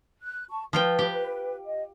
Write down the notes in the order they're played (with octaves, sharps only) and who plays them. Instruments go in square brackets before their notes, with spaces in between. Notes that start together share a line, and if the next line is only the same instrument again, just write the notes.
[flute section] F#6
A5 C#6
[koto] F3 F4 G5 [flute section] B4
[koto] G4
[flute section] D#5